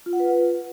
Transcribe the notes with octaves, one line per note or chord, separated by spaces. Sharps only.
F4
F#5
B4